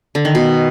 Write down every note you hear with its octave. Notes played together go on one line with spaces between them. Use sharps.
D3
D#3
B2